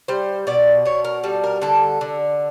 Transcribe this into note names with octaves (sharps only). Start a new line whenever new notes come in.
G3 C5
B2 D5
B2 C#5
A#4
G3 A4
A#4
D3 A4
D3